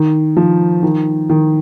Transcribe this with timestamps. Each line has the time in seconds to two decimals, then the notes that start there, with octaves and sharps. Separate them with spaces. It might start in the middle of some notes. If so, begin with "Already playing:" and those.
Already playing: D#3
0.37 F3
0.83 D#3
1.30 D#3